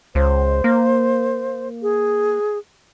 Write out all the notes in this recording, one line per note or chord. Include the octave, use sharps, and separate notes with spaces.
C#2 C5
A#3
G#4